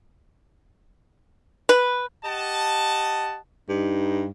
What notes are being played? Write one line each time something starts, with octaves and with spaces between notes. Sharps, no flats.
B4
G4 D#5 F#5 A5
G2 D#4